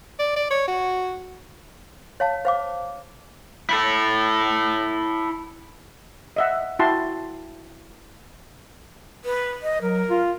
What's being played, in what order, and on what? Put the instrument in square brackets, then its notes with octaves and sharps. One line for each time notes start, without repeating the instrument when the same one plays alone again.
[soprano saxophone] D5
D5
C#5
F#4
[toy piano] C#5 F5 A5
C5 F5 D6
[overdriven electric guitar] E4 A4
[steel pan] D#5 E5 F#5
E4 F#4 G5 A5 C6
[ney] B4
D#5
[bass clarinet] F#3 [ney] A#4
[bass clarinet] F4